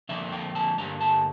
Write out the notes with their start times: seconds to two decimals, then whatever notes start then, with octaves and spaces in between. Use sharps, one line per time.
0.09 F2 D3 F3 A#3 E5
0.32 G5
0.55 A5
0.78 G2 D3 G3 A#3 A#5
1.01 A5